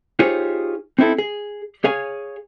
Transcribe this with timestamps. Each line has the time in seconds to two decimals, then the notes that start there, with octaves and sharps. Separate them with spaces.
0.19 D#4 F4 G4 G#4 C5 C#5
0.99 C4 D#4 E4 A4
1.18 G#4
1.84 G#4 C#5 F5 G#5